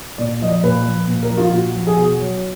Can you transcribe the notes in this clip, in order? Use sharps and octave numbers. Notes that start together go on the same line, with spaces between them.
A#2 D5
F3 D#5
D5
A#2 B4
F3
A#2
A#4
F3
F4
A#2 F#4
F3
G#4
B2 F#4
F#3